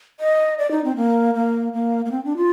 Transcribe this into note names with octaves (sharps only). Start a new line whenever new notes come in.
D#5
D5
D#4
C4
A#3
A#3
A#3
A#3
C4
D4
F4